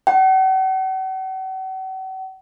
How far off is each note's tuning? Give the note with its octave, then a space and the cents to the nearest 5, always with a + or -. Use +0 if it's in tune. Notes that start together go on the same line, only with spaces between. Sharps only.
F#5 +45